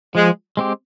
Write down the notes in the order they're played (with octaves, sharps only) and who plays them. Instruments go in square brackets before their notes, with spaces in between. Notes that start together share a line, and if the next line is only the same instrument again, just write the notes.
[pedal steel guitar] F3 [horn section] G#3
[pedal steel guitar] G#3 C4 G4